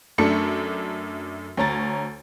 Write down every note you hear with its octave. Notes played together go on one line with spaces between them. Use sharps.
F#2 A3 D4 C#7
D2 C#5 A#5 A6